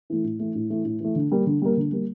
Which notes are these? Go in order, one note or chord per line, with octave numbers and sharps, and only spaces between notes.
E3 A3
A2
E3 A3
A2
E3 A3
A2
E3 A3
D3
G3 A#3
D3
G3 A#3
D3
G3 A#3